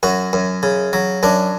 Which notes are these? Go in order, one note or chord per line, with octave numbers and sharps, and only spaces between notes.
F#2 F#4
F#2
C#3
F#3
F#2 D4